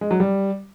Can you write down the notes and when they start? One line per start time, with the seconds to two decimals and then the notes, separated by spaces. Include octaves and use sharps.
0.01 G#3
0.11 F#3
0.20 G3